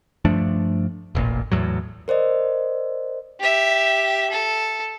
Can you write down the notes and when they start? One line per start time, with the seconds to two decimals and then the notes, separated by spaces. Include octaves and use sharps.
0.25 G2 F3 A3 D4
1.15 E1 A1 A#2
1.52 E2 A2 F#3
2.08 A#4 C5 D5 D#5
3.40 G4 E5
4.30 A4